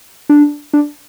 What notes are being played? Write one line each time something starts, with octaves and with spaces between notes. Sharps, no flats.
D4
D4